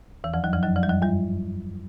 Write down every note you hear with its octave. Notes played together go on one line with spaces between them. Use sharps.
E2 E3
F2 F3
F#2 F#3
F2 F3
F#2 F#3
F2 F3
G3
F#2 F#3
G2 G3